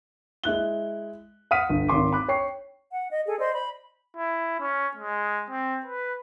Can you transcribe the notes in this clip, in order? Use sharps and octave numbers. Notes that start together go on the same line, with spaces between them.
G#3 E4 F#6 G7
F5 F#5 D#6 F6 B6 D#7
G1
G#1 C#4 C6 D6
B5 D6 F#6
C#5 G5 C#6 C7
F#5
D#5
G#4 A4 G#5
C5 D5 D#5 C6
B5
E4
C#4
G#3
C4
B4